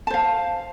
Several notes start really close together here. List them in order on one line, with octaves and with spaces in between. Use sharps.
A5 C5 F5